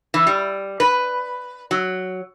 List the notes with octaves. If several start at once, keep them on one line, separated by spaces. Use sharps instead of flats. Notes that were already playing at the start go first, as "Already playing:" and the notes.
E3
G3
B4
F#3